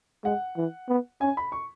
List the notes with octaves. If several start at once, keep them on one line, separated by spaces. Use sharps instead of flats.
G#3 F#5
E3
B3
C#4 G#5
B5
C#6